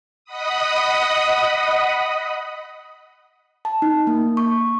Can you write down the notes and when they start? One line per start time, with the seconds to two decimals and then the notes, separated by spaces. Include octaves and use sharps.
0.25 D#5 F#5 B5 D#6
3.65 A5
3.82 D#4
4.07 A#3
4.37 C#6